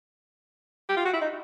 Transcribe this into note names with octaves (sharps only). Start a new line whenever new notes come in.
G4
F4
F#4
E4
D#4